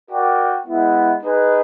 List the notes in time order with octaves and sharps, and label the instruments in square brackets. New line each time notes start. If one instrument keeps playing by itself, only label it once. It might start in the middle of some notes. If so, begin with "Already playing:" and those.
[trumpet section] F#4 A#4 D5 G5
G#3 B3 E4
D#4 G#4 B4